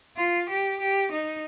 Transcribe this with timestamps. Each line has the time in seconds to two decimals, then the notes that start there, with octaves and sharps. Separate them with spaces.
0.17 F4
0.49 G4
0.80 G4
1.11 D#4